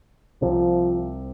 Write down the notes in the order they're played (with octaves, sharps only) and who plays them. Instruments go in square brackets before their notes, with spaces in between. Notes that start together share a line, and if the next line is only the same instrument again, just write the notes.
[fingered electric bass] C2 C3 [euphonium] F3